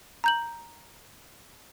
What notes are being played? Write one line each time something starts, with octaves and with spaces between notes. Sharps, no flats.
A#5 G6 F#7